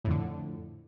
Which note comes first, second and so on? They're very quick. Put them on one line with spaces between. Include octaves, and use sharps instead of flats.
A2 F2 D3